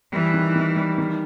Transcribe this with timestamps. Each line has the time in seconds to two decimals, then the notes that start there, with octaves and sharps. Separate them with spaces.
0.13 E3 G3
0.34 D#3
0.56 D#3
0.76 G3
0.98 D#3